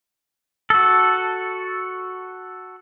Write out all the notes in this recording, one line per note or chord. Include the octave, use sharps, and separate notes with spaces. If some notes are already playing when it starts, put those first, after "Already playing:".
F#4 A4